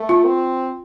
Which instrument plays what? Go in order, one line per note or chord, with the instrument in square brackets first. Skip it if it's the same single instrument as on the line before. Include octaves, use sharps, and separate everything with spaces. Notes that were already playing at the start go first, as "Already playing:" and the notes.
Already playing: [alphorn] A3
[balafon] F4
[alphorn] C4